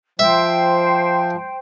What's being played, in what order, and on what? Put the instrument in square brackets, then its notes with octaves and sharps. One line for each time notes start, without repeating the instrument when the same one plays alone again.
[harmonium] F3 [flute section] C5 G5 [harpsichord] E5